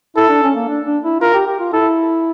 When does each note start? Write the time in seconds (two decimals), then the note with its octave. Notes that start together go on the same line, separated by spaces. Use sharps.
0.16 E4 A4
0.29 D4
0.43 C#4
0.55 A#3
0.68 D4
0.86 D4
1.04 E4
1.20 F4 A#4
1.33 G4
1.47 G4
1.59 F4
1.73 E4 A4